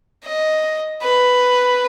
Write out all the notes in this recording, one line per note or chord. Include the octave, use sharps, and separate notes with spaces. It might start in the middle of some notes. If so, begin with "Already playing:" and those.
D#5
B4